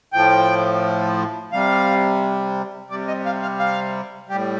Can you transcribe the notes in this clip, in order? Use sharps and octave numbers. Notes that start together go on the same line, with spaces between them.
A2 F3 G5
C3 G3 F5
C3 G3 D5
D#5
F5
F5
F5
A2 G3 G4